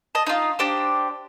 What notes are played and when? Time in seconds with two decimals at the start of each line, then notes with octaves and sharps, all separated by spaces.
0.15 D#5 A5
0.27 D#4 F4
0.59 D4 G4 C5